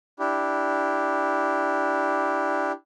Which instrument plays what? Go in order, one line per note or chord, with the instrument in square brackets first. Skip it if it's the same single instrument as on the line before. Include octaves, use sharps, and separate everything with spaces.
[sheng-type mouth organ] D4 E4 G4